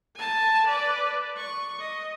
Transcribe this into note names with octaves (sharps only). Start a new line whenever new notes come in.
G#5 A5
B4 D5
C#6
D#5